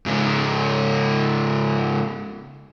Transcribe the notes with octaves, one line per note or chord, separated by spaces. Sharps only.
G#2 C#3